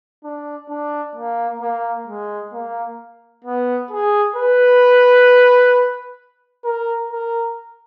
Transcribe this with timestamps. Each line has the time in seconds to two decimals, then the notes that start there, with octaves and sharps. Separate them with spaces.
0.24 D4
0.70 D4
1.16 A#3
1.62 A#3
2.08 G#3
2.53 A#3
3.45 B3
3.91 G#4
4.36 B4
6.65 A#4
7.11 A#4